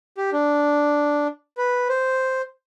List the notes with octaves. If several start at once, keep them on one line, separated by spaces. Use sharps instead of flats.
G4
D4
B4
C5